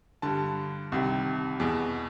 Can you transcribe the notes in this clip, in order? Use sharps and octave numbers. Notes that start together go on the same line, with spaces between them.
G2 D3 A5
C2 C3 D#3
E2 B2